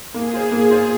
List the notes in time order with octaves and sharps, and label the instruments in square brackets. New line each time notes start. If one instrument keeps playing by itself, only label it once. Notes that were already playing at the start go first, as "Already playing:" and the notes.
[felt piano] A#3 [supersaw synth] G#4
[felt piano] F4 C5
A#3
F4 C5